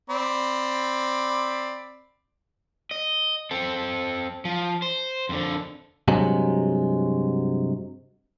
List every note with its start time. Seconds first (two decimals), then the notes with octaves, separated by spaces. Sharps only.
0.10 C4 D5 B5
2.91 D#5
3.51 C4 A4
4.45 F3
4.82 C5
5.29 F2 D3
6.08 G2 C3 F#3 G#3